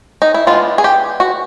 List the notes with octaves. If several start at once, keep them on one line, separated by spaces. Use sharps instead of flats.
D#4
E4
E3 G#3 B3 D4 F4
G#4
G4
F#4